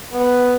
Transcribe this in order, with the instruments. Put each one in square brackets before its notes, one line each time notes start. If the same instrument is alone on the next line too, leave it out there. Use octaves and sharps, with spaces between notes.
[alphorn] B3